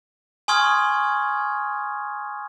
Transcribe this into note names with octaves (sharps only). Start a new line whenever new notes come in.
G#5 C6 C#6 D#6 F6 G#6